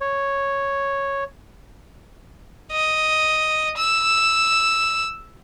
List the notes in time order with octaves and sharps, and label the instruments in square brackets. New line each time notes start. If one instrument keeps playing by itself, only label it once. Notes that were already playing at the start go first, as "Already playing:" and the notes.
[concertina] C#5
[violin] D#5
E6